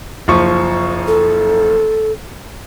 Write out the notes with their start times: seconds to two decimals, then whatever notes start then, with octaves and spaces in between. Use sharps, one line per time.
0.28 F#1 F3 C#6
1.07 A4